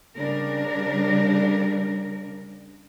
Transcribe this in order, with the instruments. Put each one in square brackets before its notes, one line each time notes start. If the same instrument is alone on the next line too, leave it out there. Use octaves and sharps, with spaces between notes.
[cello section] C#3 G3 D4 A#4